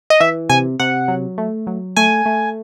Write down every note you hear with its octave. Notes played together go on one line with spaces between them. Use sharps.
D#5
E3 E5
C3 G#5
C3 F#5
F#3
A3
F#3
A3 G#5
A3